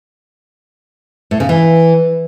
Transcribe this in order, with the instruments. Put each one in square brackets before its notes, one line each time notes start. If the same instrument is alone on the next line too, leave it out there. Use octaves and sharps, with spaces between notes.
[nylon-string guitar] A2
C#3
E3